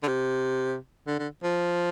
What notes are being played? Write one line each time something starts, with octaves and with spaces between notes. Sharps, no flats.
D3
C3
D3
D3
F3